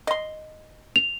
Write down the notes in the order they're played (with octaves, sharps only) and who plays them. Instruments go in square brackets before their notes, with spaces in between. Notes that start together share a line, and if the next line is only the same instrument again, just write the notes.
[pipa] D#5 C6
[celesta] F7